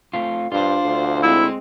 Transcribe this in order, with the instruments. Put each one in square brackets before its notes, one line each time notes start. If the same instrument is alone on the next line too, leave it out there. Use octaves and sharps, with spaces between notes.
[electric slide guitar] A3 C4 F4
[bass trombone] G2 [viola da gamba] D4 C5 [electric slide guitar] F4
[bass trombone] D2
[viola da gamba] G#3 C4 [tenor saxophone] E4